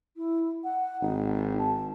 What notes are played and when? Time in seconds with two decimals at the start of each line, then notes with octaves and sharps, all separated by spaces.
0.17 E4
0.64 F#5
1.02 G#1 D#4
1.59 A5